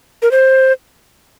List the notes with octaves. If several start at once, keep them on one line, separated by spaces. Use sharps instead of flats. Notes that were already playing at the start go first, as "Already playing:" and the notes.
A#4
C5